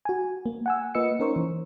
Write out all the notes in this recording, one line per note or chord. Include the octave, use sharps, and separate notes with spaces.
F#4 G#5
A#3
F#5 G#5 E6
A#3 F4 B4 D#5 E6 C#7
C#4 D#4 A#4 C5 C#6
E3